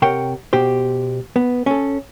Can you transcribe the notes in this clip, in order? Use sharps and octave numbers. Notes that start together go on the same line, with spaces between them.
C3 A#4 C#5 F#5 G5
B2 G4 C5
B3
C#4 A4